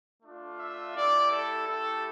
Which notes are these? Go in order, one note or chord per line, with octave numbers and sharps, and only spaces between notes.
A3 D4 F4
E5
A3 E4 G4 D5
A4
A3 E4 G4 A4